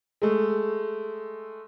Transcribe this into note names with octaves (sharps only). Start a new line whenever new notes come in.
G#3 A3